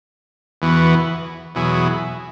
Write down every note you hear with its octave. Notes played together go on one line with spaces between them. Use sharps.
E2 E3 B3 F#4
E2 B2 F#3 E4 G#4